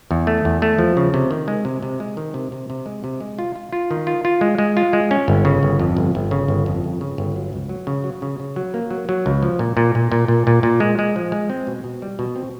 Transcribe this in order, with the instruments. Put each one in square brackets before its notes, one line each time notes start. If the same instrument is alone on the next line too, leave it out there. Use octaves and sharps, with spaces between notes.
[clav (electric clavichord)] E2
A3
E2
A3
F3
C#3
C3
D#3
G#3
C3
C3
G#3
D#3
C3
C3
C3
G#3
C3
G#3
F4
F4
F4
D#3
F4
F4
G#3
G#3
F4
G#3
C#4
G1
C#3
G1
F2
G1
G1
C#3
G1
F2
G1
C#3
G1
F#3
C#2
F#3
C#3
F#3
C#3
C#3
F#3
A#3
F#3
F#3
C#2
F3
A#2
A#2
A#2
A#2
A#2
A#2
A#2
G#3
G#3
F3
G#3
C4
B2
B2
G3
B2
C4